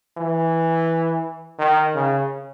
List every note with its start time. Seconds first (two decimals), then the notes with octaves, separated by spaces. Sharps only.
0.17 E3
1.59 D#3
1.95 C#3